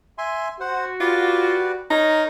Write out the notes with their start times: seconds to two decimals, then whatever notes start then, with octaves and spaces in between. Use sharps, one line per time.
0.18 E5 G#5 C6
0.60 F#4 C5 F#5
1.00 F4 G4 B4 D5
1.90 D#4 A#4 C#5